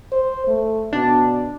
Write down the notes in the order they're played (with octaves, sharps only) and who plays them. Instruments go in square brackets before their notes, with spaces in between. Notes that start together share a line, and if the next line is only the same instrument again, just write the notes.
[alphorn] C5
A3
[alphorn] B2 [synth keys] D4